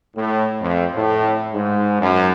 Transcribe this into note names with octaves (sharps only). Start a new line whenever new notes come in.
A2
F2
A2
G#2
F#2